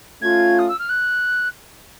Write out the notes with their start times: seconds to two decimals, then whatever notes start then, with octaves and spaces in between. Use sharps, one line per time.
0.21 A3 C#4 F4 G#6
0.59 D#6
0.69 E6
0.79 F6
0.89 F#6